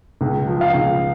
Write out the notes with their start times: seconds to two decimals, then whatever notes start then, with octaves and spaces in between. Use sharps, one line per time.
0.21 C#2
0.47 F3
0.61 F5
0.74 C#2